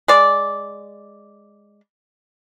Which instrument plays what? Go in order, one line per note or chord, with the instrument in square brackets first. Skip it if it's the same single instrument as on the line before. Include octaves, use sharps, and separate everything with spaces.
[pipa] G#3 D5